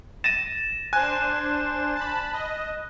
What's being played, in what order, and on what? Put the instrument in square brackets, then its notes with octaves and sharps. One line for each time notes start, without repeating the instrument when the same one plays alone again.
[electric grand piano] A6 A#6 D#7 [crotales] E7
[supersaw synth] D4 C5 E7 [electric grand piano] G#5 [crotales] F#6
[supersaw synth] A5 B5
D#5